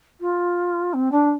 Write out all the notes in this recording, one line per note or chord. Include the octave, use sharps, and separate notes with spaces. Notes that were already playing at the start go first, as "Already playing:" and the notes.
F4
C4
D4